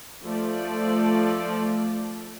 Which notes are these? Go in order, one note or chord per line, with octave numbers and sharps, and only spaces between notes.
F3 A3 A4 D5